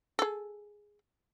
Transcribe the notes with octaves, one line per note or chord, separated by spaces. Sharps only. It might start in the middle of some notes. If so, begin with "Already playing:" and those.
G#4 A4